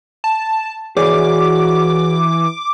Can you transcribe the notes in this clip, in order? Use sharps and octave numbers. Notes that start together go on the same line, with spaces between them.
A5
E3 F#4 G#4 C#5 D5 D6